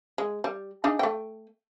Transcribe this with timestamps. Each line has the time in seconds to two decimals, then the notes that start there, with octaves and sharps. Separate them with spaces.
0.18 G#3
0.44 G3
0.84 D4 D#4 G#4
0.99 A3 G5